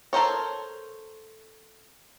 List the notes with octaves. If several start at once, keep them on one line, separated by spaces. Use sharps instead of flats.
A4 A#4 C5 C#5